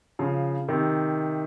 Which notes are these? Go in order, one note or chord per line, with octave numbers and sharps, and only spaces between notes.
C#3 F3
C3 D#3